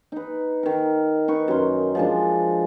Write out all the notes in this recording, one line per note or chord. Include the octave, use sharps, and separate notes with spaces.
D#4 B4
D#3 A#4
D#4 B4 C#6
F#2 C6
F3 G#3 D4